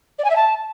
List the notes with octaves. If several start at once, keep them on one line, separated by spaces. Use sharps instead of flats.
D5
G#5
E5
A5